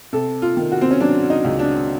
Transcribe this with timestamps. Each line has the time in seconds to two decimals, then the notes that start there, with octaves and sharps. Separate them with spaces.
0.13 C3 A4
0.42 F4
0.57 D#3
0.72 F#4
0.81 C4
0.91 C#4
1.00 F#3 D4
1.30 D#4
1.44 C#2
1.59 D4